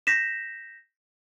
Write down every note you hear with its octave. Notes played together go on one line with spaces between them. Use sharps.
G6 A#6 B6 E7